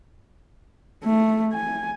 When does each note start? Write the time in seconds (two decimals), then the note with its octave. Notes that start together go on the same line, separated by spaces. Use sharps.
1.04 A3
1.53 G#5